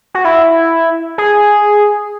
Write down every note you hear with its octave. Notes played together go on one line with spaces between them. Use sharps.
F#4
E4
G#4